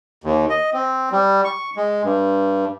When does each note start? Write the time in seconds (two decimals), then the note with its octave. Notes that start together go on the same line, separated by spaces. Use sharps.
0.24 D#2
0.50 D#5
0.73 C4
1.12 G3
1.44 C#6
1.76 G#3
2.04 G2